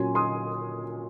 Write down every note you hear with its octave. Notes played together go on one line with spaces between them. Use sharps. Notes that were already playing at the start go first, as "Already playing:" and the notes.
Already playing: A#2 F#3 C#4 G#5 C6
C6 D#6